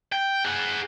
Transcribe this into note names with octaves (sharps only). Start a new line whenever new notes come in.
G5
G#4 F#5